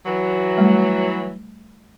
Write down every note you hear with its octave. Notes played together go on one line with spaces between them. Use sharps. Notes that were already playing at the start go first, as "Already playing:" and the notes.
E3 F#3
G3 A3